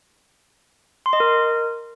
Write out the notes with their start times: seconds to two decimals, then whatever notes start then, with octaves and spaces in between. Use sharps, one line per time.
1.06 C6
1.13 D#5
1.20 A#4